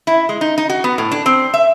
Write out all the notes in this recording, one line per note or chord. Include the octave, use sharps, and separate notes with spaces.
E4
G#3
D#4
D#4
F#4
B3
A2
D4
C4
E5